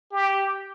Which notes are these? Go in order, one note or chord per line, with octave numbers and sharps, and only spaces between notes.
G4